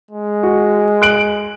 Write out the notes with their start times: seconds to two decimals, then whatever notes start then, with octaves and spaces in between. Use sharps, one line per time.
0.11 G#3
0.43 F#4
1.02 F#6 D7 F#7